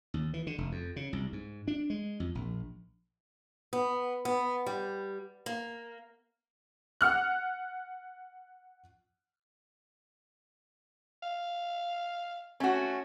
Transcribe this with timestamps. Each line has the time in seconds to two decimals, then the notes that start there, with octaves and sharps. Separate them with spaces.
0.14 D#2
0.34 E3
0.47 D3
0.58 F1
0.72 F2
0.96 C#3
1.13 C2
1.33 G#2
1.68 D4
1.90 G#3
2.20 F2
2.35 A#1
3.73 B3
4.25 B3
4.66 G3
5.46 A#3
7.01 F#5 F6 F#6
11.23 F5
12.60 A3 C#4 F#4